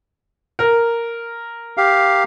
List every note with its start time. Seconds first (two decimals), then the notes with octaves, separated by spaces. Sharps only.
0.59 A#4
1.77 G4 F5